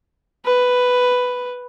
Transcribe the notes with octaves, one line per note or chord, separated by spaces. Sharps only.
B4